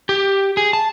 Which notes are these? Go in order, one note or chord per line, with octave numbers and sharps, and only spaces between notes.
G4
G#4
A5